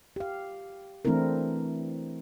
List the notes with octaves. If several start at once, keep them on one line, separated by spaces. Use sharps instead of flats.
G4 F5
E3 A3 C4 D4 E4 A#4